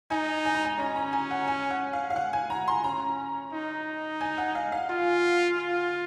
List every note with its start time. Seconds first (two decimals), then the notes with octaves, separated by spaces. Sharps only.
0.10 D#4 G#5
0.45 G#5
0.55 A#5
0.65 G#5
0.79 C#4 A#5
0.96 A#5
1.13 G#5
1.31 F#5
1.48 G#5
1.70 F#5
1.93 F5
2.10 F5
2.16 F#5
2.33 G#5
2.50 A#5
2.68 C6
2.84 C#4 A#5
3.53 D#4
4.21 G#5
4.38 F#5
4.55 F5
4.72 F5
4.90 F4
5.58 F4